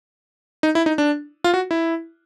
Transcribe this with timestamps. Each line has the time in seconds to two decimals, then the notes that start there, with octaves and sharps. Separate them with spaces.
0.63 D#4
0.75 E4
0.86 D#4
0.98 D4
1.44 F4
1.54 F#4
1.71 E4